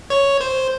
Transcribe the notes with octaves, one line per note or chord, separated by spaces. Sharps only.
C#5
C5